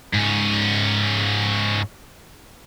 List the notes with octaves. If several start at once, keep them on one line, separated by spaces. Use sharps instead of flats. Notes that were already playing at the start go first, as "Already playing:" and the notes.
G#2 C#4